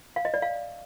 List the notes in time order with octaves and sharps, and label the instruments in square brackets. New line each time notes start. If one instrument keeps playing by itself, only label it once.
[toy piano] F5
D#5
D5
F5